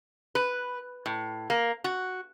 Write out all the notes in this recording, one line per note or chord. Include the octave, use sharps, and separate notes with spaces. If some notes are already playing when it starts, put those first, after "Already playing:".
B4
A2
A#3
F#4